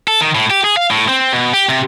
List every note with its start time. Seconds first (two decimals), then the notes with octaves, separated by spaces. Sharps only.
0.08 A4
0.21 D#3
0.35 A2
0.50 G4
0.64 G#4
0.77 F5
0.91 A2
1.08 C4
1.33 B2
1.53 G4
1.69 C3